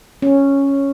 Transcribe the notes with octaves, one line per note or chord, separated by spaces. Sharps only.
C#4